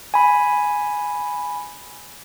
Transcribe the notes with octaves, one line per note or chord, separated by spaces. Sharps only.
G#5 B5